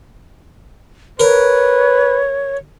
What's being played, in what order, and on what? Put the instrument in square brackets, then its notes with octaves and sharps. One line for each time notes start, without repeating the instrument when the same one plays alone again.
[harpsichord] A#4 [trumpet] B4 [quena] C#5